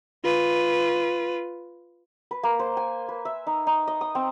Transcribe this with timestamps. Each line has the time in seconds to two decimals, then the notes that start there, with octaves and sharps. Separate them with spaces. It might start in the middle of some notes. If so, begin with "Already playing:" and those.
0.24 F4 B4
2.31 B4
2.43 A#3
2.59 C5
2.77 G#5
3.09 B4
3.25 E5
3.47 D#4
3.67 D#4
3.87 D#5
4.01 D#6
4.15 C4